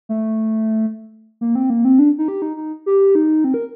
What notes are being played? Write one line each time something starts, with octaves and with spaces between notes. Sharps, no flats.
A3
A#3
C4
A#3
C4
D4
D#4
G4
D#4
D#4
G4
D#4
C4
A#4